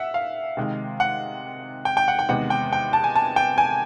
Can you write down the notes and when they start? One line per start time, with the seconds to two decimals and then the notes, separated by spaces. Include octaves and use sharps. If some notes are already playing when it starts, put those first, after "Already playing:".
Already playing: E5 F#5
0.14 F5
0.57 C3 D#3 G#3
1.00 F#5
1.85 G5
1.97 G5
2.08 F#5
2.19 G5
2.29 E2 C3 D#3 G#3 B3 F#5
2.50 G5
2.73 G5
2.93 A5
3.04 G#5
3.16 A5
3.36 G5
3.58 G#5